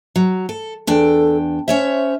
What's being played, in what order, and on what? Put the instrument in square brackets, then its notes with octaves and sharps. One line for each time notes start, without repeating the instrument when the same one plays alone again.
[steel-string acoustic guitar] F#3
A4
[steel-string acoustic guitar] E2 D4 G5 [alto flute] A4
[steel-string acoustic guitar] C#4 C#5 E5 [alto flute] C5